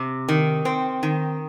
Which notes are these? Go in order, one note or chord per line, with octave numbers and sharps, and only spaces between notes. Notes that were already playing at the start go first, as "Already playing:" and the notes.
Already playing: C3
D#3
C4
D#3